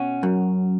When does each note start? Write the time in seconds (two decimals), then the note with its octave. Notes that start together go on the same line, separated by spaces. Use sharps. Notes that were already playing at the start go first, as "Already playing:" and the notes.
Already playing: B2 C#4 F#4
0.23 F#2